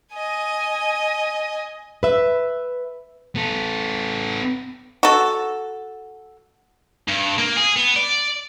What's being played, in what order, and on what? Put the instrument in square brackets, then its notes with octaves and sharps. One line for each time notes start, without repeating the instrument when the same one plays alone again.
[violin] D#5 G#5
[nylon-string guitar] B4 E5
[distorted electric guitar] B3 A4
[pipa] F#4 A4
[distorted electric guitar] G2
A#3
G#4
B3
D5